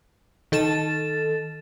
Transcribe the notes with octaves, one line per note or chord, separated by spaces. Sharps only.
D#3 A4 A6 E7